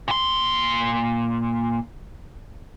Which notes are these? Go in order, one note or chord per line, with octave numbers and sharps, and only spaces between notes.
A#2 C6